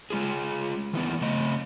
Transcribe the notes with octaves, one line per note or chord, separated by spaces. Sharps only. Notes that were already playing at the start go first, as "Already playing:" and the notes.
G#3 F4 G#4
D#3 E3 B3
C#3 A3 D#5